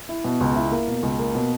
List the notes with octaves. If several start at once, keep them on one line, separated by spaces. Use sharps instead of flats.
E4
B2
C#2
E4
A#3
B2
C#2
A#3
B2